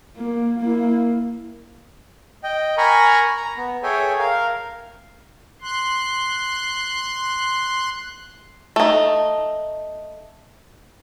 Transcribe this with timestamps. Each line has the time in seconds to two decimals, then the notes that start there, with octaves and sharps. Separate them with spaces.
0.17 A#3
0.59 A#3 E4
2.43 D#5 G5
2.77 A#4 G#5 A#5 B5 C#6
3.37 A#5
3.57 B3
3.83 G#4 A4 C#5 E5 G5 G#5
4.19 A#4 F5
5.62 C6 F#6
8.76 A3 D#4